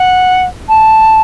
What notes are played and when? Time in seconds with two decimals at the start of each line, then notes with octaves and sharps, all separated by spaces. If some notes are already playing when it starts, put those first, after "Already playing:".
Already playing: F#5
0.68 A5